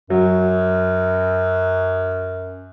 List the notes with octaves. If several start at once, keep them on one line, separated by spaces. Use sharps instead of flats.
F#2 F#3